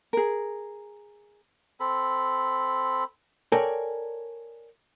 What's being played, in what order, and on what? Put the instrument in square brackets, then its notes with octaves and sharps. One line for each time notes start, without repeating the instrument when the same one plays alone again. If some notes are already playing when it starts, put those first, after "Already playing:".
[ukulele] G#4 A#4
[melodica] C4 A4 B5
[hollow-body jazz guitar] A4 A#4 C#5 D5 G5 G#5